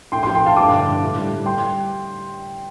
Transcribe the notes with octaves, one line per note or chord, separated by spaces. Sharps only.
A2 G5 C6
G5 C6
F3
G5 C6
A2 F5 A5
G2 A5 D6
D3
G2
A2
G3
G3
G5 C6